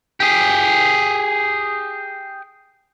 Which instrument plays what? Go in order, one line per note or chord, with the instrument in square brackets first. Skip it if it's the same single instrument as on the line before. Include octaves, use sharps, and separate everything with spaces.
[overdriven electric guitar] G4 G#4